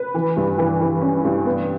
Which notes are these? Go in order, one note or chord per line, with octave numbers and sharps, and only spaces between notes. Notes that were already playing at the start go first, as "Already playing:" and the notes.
Already playing: B4
E3
G2
E3
E3
C#4
G2
B3